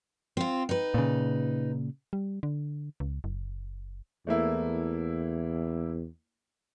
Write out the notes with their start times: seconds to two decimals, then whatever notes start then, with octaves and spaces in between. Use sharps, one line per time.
0.37 C4 F4
0.69 D#4 B4
0.94 A#2 C#3
2.13 G3
2.43 D3
3.00 C#2
3.24 F#1
4.27 E2 A3 A#3 E4